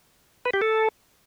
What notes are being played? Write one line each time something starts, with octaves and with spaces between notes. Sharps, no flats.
B4
G4
A4